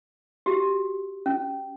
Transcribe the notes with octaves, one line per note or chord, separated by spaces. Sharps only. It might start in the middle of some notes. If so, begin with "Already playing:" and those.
F#4 G4
C#4